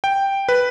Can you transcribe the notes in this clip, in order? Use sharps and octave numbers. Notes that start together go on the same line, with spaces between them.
G5
B4